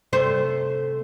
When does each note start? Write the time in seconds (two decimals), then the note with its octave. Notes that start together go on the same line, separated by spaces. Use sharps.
0.13 C3 A3 C5